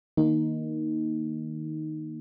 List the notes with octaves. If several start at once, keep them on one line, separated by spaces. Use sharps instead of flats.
D#3 A#3 D#4